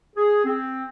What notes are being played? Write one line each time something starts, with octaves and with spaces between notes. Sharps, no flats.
G#4
C4